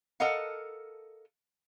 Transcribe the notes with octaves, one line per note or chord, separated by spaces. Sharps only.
A4 A#4 D#5 F5 F#5